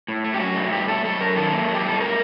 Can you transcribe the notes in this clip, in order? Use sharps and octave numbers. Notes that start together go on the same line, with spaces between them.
A2
A3
G4
F#2 F#4
A3
G2 G4
A3 A4
F#2 A4
F#3 A#4
D#3 A4
A#3
F#3
G4
G2 A4
A3 A#4